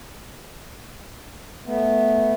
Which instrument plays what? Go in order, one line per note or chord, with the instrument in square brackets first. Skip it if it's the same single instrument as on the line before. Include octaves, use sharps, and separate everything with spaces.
[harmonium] A3 B3